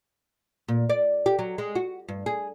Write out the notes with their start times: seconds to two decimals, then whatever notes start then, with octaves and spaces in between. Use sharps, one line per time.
0.68 A#2
0.89 D5
1.26 G4
1.39 F#3
1.58 G#3
1.75 F#4
2.08 G2
2.26 G#4